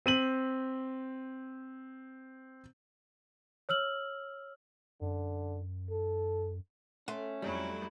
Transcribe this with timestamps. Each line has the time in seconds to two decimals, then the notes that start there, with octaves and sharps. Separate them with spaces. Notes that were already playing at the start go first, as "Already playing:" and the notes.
0.06 C4 D#7 F#7
3.69 C#5 E6 F6 F#7
5.01 F#2 D3
5.90 A4
7.08 A3 C#4 F#5 C6
7.42 F2 F#3 G3 E4